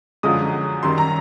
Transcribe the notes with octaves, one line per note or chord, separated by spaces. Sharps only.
F#2 D3 F3 G#3 D#6
F#2 D#3 G3 C6
A#5